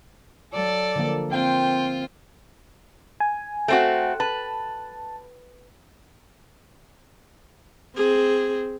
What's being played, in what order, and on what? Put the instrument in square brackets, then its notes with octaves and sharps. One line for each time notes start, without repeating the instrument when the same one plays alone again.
[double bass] F#3 [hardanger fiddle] A4 D5
[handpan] D3 F3 A#3
[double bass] C4 [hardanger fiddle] F4 [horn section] G5
[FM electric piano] G#5
[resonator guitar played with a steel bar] A3 C4 F#4
[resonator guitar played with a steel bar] B4 [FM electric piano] A5
[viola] C4 G#4